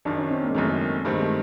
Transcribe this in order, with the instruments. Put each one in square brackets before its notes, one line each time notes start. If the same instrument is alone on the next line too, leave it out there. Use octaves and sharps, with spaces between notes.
[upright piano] F#1 F#2 D#3 [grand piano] D4
[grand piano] C#4
C4
A#3
G#3
[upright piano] F#1 F#2 D#3 [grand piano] A3
[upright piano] G2 D#3 G3 C4 [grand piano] A3
[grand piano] G#3
A3